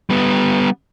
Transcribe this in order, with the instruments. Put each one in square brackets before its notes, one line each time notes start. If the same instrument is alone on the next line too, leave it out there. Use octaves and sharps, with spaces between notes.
[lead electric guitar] G3 B3